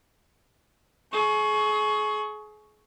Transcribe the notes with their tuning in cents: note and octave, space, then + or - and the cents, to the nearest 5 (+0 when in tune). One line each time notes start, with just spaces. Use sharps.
G#4 +35 C#6 +0